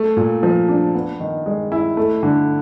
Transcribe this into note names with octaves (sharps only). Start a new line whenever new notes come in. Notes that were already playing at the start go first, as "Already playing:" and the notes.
Already playing: A3
A#2
F3
D4
B3
D#3
G#3
E4
A3
D3